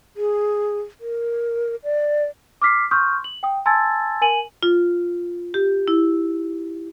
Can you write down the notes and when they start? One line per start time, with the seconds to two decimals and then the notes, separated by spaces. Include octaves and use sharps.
0.17 G#4
1.01 A#4
1.84 D5
2.62 D6 F6 B6 C7
2.91 C6 C#6 D#6 F6 G6
3.24 F#7
3.43 G5 D#6
3.66 G#5 A5 C6 E6 G#6 A6
4.21 A#4 G#5 D#7 F#7
4.63 F4
5.54 G4
5.88 E4